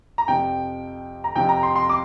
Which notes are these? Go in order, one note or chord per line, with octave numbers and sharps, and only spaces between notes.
A#5
F2 C3 F3 G5
A#5
F2 C3 F3 G5
A#5
C6
C6
D6